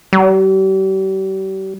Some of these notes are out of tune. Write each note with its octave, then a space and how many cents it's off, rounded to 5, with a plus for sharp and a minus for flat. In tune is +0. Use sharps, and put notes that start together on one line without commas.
G3 -40